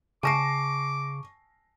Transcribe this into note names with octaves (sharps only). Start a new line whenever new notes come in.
C#3 G#5 A5 C#6 D6 A#6 C7 D7